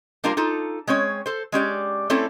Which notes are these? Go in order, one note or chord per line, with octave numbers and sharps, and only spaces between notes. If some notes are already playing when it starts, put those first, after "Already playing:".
G3 A#3 D4 F4 G4 A#4
D#4 F4 A4
G#3 C4 C#4 C#5
A4 C5
G#3 C#4 G4 D5
A3 C4 C#4 E4 A4